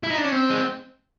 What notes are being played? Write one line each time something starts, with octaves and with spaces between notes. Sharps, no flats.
E4
D#4
D4
C#4
C4
G#3